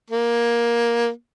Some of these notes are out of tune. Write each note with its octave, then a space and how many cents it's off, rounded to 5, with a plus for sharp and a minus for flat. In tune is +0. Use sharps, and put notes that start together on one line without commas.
A#3 +15